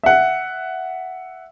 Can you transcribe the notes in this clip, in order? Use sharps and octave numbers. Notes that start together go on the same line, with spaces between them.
E5 F#5